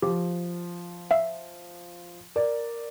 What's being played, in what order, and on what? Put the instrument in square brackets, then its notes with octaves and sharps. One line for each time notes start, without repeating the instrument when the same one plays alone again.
[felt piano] F3 [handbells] G4
[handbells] E5 F5
[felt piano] A#4 D5